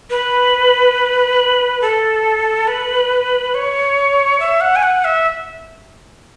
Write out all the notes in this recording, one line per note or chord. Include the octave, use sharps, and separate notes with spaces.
B4
A4
B4
C#5
E5
F#5
G#5
F#5
E5